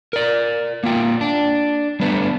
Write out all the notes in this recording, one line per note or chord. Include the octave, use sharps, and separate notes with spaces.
A#4 D5
A#3 F4 G5
D4
G3 A3 B3 D4 B4